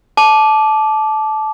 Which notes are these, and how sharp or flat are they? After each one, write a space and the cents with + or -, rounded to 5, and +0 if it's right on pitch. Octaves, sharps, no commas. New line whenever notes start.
A5 -20 D6 +0